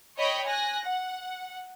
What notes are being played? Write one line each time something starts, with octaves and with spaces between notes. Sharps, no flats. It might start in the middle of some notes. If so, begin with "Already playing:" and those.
C#5 D#5 G5 B5
G#5 F#6 A#6
F#5